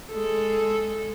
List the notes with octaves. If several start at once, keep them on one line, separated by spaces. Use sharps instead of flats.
G#3 A4